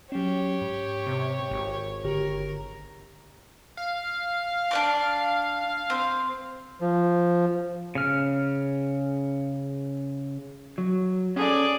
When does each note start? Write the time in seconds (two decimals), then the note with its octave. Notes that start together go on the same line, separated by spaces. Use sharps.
0.12 F#3 C#4 G4 C#5
0.61 G#2
1.07 C3
1.51 G#1
2.05 G1 D3 G4 A#4
3.77 F5
4.71 D4 D5 D6
5.90 C4
6.81 F3
7.95 C#3 F6
10.78 F#3
11.36 C#4 G#4 A4 D5